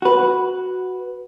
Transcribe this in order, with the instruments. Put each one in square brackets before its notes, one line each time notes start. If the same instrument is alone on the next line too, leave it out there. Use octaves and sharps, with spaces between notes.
[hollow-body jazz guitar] F#4 B4